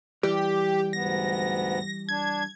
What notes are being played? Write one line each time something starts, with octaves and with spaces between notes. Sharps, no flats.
E3 G3 G4
D2 G#2 B3 A#6
D4 G#6